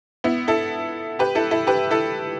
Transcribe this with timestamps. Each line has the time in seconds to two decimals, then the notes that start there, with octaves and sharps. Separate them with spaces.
0.24 B3 E4
0.48 E4 A4
1.19 G4 B4
1.35 E4 A4
1.51 E4 A4
1.67 G4 B4
1.91 E4 A4